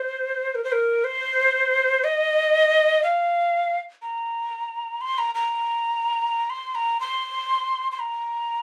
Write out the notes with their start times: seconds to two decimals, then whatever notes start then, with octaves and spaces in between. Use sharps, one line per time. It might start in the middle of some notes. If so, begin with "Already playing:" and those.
Already playing: C5
0.55 A#4
0.64 C5
0.72 A#4
1.04 C5
2.04 D#5
3.03 F5
4.02 A#5
5.01 C6
5.18 A#5
5.35 A#5
6.50 C6
6.75 A#5
7.00 C6
7.92 C6
7.99 A#5